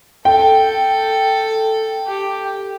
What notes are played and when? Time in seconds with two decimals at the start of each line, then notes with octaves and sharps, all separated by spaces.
0.25 A4 G5
2.06 G4